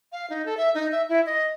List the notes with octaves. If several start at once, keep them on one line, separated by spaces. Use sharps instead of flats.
F5
D#4
A4
E5
D#4
E5
E4
D#5